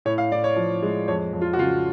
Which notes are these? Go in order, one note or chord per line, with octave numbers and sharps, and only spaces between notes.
A2 C#5
F5
A2 D5
C#5
F3
G#3
F2 C#5
F2
F4
F#4
C#3 F4